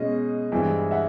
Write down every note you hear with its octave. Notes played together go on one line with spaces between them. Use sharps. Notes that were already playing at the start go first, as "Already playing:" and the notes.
Already playing: B2 G#3 C#4 D#5
G2 E3 G#3 C4 E4
E5 F#5